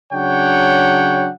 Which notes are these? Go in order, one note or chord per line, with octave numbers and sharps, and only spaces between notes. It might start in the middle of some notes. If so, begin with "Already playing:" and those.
C#3 F#3 D4 C#5 F#5 G5